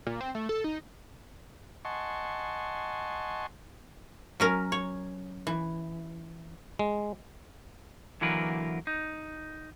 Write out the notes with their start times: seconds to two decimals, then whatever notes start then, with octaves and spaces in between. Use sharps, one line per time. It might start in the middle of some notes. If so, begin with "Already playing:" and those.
0.07 A#2
0.21 C4
0.35 A3
0.49 A4
0.64 D#4
1.85 D#5 F#5 G#5 A5 C6 C#6
4.40 F#3 C#4 A#4
4.72 C#5
5.47 E3
6.79 G#3
8.21 D3 E3 F#3 A#3 A#4 B4
8.87 D#4